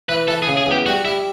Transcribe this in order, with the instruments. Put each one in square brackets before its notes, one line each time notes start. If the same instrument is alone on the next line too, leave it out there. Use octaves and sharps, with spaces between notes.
[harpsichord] E3 [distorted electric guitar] B4
[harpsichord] E3 [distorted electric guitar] A4
[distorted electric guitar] G#4
[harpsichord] C#3
[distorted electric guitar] G#4
[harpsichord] E2
[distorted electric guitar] G4
[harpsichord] G3 [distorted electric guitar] F#4
[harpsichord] G3 [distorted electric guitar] E4